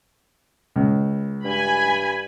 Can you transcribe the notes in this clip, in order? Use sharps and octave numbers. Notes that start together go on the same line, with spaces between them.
C#2
G2 G#5 B5